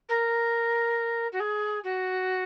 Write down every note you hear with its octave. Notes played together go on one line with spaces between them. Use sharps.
A#4
F#4
G#4
F#4